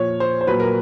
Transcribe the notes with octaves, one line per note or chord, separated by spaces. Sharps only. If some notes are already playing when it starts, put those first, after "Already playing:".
Already playing: A#2 F3 C#5
C5
C5
A#2 F#3 B4
A#4